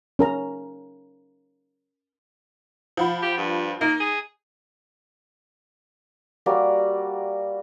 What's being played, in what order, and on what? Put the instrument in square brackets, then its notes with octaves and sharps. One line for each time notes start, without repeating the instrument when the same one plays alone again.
[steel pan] C#4 A#4 A#5
[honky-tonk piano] F3 F#5 B5
[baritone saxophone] G4
G2
[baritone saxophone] A#3 [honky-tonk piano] D#4
[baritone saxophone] G#4
[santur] G3 A#3 F#4 D5